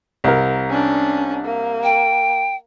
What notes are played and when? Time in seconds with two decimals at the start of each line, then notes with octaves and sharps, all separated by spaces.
0.24 C2 A#4
0.69 C#4 D4
1.45 A#3
1.84 G5